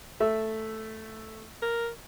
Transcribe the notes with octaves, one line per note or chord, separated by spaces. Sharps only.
A3 E5
A#4